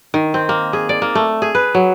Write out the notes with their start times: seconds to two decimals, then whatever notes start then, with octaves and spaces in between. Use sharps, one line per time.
0.14 D#3
0.34 C4
0.49 A#3
0.73 G#4
0.89 D5
1.02 A#3
1.15 A3
1.42 G#4
1.55 B4
1.75 F#3